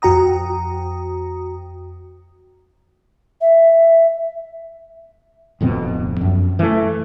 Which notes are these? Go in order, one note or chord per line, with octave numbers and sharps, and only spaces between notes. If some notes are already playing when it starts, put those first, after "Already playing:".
F2 F#4 G5 A#5 D#6
E5
D1 F2 B2 C4
F#2
E3 A3